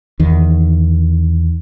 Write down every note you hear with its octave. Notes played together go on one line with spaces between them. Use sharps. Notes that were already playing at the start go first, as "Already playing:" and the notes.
E2 D#3